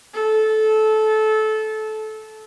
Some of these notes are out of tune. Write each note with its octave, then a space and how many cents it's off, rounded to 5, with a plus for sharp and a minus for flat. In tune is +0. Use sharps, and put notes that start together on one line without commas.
A4 -20